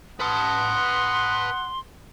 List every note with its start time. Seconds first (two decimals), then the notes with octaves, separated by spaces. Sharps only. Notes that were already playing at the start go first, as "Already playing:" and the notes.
0.20 B4 F#5 A5 C6 D#6